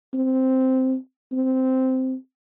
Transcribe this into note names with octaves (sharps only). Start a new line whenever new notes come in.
C4
C4